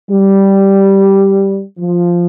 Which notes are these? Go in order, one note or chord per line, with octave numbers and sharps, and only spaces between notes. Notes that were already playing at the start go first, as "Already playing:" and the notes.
G3
F3